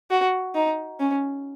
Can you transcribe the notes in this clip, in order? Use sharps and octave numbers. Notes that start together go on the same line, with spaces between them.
F#4
D#4
C#4